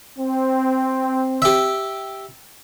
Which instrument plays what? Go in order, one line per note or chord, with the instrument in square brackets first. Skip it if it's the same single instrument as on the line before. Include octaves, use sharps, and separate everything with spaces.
[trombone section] C4
[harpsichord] G4 E5